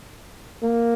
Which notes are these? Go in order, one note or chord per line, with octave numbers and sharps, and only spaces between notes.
A#3